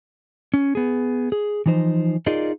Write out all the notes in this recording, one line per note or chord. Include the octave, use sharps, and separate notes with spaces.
C#4
B3 G#4
G#4
E3 F3 D#4 C5
D#4 F4 G#4 A#4 D5 D#5